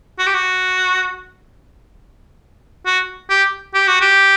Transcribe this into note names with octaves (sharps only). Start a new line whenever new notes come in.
F#4
G4
F#4
F#4
G4
G4
F#4
G4